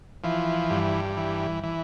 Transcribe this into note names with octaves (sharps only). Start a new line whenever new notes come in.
E3 F3
G2
E3
E3